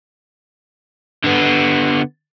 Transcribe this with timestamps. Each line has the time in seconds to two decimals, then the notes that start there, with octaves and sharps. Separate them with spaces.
1.24 D3 B3